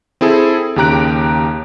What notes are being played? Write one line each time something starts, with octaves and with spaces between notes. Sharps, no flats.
C4 E4 G#4 A4
D#2 C#3 G4 A#5 F#6 D7